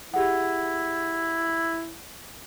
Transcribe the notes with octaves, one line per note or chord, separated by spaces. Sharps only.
E4 G4 G#4 F#5